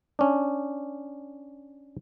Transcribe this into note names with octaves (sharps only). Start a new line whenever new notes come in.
C#4 D4